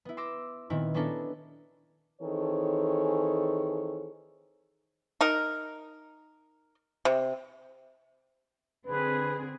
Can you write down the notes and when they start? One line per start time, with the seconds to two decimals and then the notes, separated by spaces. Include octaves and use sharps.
0.05 B3 E4
0.17 C6 D6 E6 A#6
0.70 A#2 D#3 B3 C4 E4
0.94 B3 C#4 D4 E4 A4 A#4
2.21 D#3 E3 C4 G#4 A4 C#5
5.21 D#4 A#4
7.05 C3
8.86 D3 C4 G#4 B4